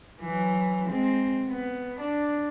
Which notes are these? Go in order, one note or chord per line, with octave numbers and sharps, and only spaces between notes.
E3 F#3
G#3 C4
B3
D4